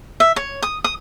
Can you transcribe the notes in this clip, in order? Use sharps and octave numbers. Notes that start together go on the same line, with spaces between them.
E5
C#5
D#6
D#6